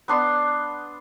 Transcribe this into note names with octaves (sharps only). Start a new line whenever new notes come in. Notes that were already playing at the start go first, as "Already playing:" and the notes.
B3 D4 C6